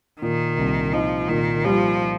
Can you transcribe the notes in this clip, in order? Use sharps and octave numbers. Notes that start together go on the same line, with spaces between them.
A#2 D#3
C2
F3 D#4
A#2 D#3
F3 G3